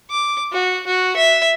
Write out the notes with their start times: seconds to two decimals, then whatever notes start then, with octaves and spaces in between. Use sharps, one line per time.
0.10 D6
0.52 F#4
0.87 F#4
1.16 E5